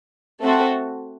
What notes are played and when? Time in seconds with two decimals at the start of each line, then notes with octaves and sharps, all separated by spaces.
0.41 A3 C4 F#4 A4